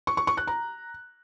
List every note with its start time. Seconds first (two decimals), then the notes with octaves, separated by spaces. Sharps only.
0.07 C#6
0.17 C#6
0.27 C#6
0.37 F#6
0.47 A#5